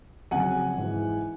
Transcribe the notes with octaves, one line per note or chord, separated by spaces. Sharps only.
F2 C#3 F#3 F#5 G#5
G#2 E3